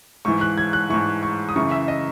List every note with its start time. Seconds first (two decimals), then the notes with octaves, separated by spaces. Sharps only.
0.25 G#2 E3 C#6
0.41 F#6
0.58 G#6
0.73 F#6
0.90 G#2 E3 C#6
1.23 C#6
1.49 D#6
1.56 F#2 C#3 E3 C#6
1.71 E5
1.88 D#5